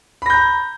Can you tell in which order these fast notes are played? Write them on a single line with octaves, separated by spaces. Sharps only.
B5 A#6 G6 A#5